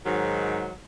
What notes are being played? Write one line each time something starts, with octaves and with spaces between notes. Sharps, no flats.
G#2 D#3 F#3